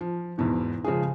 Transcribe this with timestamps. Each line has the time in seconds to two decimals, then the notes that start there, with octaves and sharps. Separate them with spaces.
0.01 F3
0.38 E2 G#2 B2 E3
0.84 C#3 F3 G#3 G#4